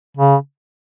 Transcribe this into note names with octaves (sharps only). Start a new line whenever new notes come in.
C#3